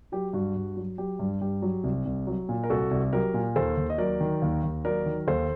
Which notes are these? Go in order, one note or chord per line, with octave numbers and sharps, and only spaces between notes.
F#3 G4
G2 F#4
G2
F#3
F#3 G4
G2
G2 G4
F#3
C2
C2
F#3
A#2
A#4
C2 F#4 A4
C2
F#3 G4 A#4
A#2
D#2 A4 C5
D#2
D#5
F#3 A#4 D5
D#3
D#2
D#2
F#3 A#4 D5
D#3
D#2 A4 C5